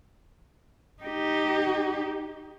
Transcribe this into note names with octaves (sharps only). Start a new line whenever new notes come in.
D#4 G4